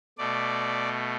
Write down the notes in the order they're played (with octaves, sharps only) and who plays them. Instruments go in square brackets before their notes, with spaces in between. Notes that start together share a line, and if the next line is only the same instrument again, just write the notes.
[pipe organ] B2 A3 D5